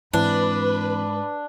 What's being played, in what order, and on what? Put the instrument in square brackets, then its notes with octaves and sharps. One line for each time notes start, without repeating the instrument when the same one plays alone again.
[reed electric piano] E2 E3 C4 [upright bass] G#2 [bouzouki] D4 [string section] B4